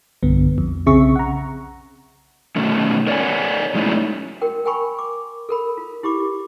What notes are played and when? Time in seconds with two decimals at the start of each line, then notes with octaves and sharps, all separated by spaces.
0.23 B1 G2 D3 B3
0.58 F2
0.86 B1 C#3 C4 G#4 E5 C#6
1.16 F#5 A#5
2.56 B2 D#3 A3 C#4
3.07 A#4 C#5 D5 E5 F#5 G#5
3.75 F#3 G#3 A3 C#4 D#4 E4
4.41 F#4 A#4 G5
4.65 A#4 G5 G#5 B5 C#6
4.98 D6
5.49 A4 A#4 B5
5.78 F4
6.03 E4 G4 B5 D6